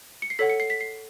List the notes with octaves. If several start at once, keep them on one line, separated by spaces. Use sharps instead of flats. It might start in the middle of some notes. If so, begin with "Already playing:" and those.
C#7
C7
A4 C#5 F#5 B6
C#7
C7
B6
C7